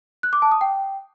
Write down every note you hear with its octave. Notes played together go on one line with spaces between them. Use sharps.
F#6
D6
A5
D#6
G5